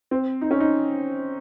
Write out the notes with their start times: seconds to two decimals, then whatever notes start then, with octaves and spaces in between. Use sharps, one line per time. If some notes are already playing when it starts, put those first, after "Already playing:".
0.11 C4
0.41 D#4
0.51 C#4
0.60 D#4